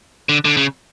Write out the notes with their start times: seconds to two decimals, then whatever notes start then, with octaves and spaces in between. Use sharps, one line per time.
0.29 D3
0.45 D3
0.57 C#3